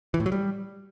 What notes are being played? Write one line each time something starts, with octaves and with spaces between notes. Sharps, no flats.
E3
A2
F#3
G3